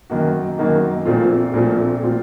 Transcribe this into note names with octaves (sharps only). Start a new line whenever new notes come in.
F#2 D#3 A#3 D#4 F#4
F#2 D#3 A#3 D#4 F#4
A#1 A#2 A3 C4 F4
A#1 A#2 A3 C4 F4
A#2 A3 C4 F4